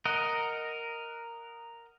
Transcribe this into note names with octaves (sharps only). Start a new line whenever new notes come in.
A#4 D#5 F#5